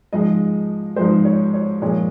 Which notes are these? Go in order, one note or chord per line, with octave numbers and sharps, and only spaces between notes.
G#2 F3 G#3 D#5
G#2 F3 G#3 C5
C#5
C#5
A#2 F3 G#3 C#5